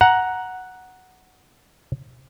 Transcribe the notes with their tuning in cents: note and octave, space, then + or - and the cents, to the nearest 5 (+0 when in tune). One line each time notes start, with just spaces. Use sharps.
F#5 +0 A#5 +10